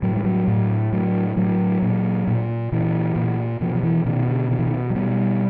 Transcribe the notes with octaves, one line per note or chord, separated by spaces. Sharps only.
A2 F#3
G3
F#3
A2
A2 F#3
A2 F#3
A#2
A#2
A#2 E3
A#2
B2 F3
F3
E3
B2 D#3
D3
B2 D#3
E3
D#3
F#3
B2 G3